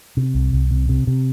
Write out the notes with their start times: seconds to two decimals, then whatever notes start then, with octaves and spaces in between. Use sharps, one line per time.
0.17 C3
0.34 C2
0.53 C2
0.71 C3
0.89 C3
1.07 C3